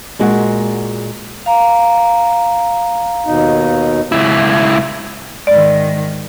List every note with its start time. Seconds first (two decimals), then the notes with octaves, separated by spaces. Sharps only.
0.19 A#2 G#3 F#4
1.46 F5 A#5
3.26 D#2 B2 D#4
4.12 C#2 E4
5.47 G#2 D#3 D5